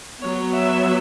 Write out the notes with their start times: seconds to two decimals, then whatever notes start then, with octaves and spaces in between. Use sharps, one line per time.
0.21 F#3 B3 C#5
0.55 E5